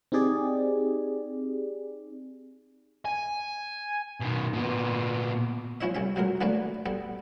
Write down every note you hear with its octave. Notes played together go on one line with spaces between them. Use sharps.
C4 D#4 G4 G#4 D5
G#5
B2 D#3
A#2 B3
F3 C#4 E4 C#5 D#5 E5
C2 C#4 E5
B2 F#3 G#3 A#4
D3 E3 A3 A#3 B4 D5
G3 B3 A4